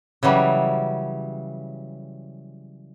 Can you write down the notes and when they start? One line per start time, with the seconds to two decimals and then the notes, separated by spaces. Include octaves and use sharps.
0.23 C#3 E3 F#3 G3